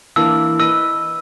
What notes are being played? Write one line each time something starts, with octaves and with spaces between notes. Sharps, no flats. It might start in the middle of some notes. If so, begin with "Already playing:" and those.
E3 A#3 D4 E6
B4 D#5 E6